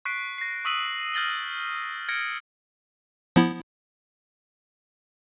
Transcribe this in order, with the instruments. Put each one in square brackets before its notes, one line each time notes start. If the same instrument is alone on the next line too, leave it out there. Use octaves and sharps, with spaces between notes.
[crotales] C#6 F#6 B6 C7 D7
A#6 C7
C#6 D#6 E6 B6 D#7 F#7
F6 G6 A6 A#6 F#7 G7
F6 G#6 A#6 C#7 D7
[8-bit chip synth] F3 B3 E4